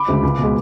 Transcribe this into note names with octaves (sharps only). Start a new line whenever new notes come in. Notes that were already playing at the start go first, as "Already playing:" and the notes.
Already playing: B5 D6
D2 C#3 G#3
C#2
B2
G#3